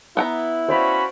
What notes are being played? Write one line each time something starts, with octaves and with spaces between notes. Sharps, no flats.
B3 E4 F#5 A#5
C#4 F#4 C5 D5 F5 B5